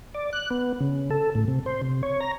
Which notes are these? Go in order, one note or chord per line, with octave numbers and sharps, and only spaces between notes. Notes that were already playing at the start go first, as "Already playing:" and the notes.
D5
F#6
B3
C#3
A4
A2
C3
C5
C3
C#5
A#5